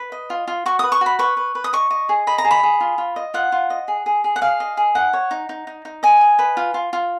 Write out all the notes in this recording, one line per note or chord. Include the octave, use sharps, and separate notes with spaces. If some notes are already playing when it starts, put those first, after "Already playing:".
Already playing: B4
D#5
F4
F4
F#4 C#6
B4 D#6
C#6
F#4 B5
B4 C#6
B4
B4
D#6
D#5 C#6
D#5
G#4
D#5 B5
A#5
G#4
B5
G#4
F4
F4
D#5
F4 F#5
F4
D#5
G#4
G#4
G#4
F#5
G#4 F5
D#5
G#4
D#4 F#5
C#5
D#4
D#4
D#4
D#4
D#5 G#5
D#5
B4
F4
F4
F4